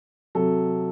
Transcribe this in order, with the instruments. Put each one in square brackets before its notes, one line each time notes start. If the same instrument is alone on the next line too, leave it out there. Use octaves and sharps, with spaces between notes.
[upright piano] C3 F#3 A4